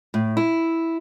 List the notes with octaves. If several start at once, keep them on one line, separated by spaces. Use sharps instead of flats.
A2
E4